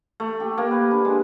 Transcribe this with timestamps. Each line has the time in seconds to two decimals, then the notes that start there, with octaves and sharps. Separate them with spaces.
0.20 A3
0.40 G4
0.58 A#3
0.71 B4
0.91 D4
1.05 G#3